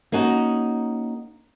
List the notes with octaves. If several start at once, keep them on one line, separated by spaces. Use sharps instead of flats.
A#3 C#4 D#4 F#4